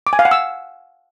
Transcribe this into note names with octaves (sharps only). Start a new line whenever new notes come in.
D6
G#5
F5
F#5
E6